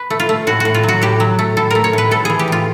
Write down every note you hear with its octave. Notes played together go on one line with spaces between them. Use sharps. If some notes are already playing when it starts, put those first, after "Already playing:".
Already playing: B4
A3
F4
A3
A2 F#4
A2 F#4
F4
F#3
F#4
A2 G4
F#3
A3
A2 A4
A3 A#4
C#5
A2 B4
A2 A4
E3 G#4
G4
A2 F4